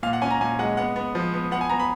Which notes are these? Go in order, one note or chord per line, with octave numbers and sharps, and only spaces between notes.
A#2 F5
F#5
C#4 G#5
A#5
A#2 G#5
G#3 F#5
B3 F#5
B3
F3
B3
B3 F#5
G#5
B3 A#5
B5